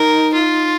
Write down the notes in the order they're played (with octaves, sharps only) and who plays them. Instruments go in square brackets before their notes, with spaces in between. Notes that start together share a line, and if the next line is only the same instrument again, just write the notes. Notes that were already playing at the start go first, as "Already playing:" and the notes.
Already playing: [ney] D#4 [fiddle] A#4
[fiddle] F4